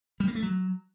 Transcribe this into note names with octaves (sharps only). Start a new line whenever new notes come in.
G3
A#3
A3
F#3